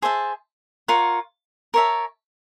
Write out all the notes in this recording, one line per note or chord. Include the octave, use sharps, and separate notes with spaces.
G#4 C5 E5 A5
F4 A#4 C#5 F#5
A#4 C#5 E5 A5